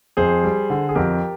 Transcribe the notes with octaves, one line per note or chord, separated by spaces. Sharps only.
F2 G#4 C5
G3
D3
G#4
F2 G4 A#4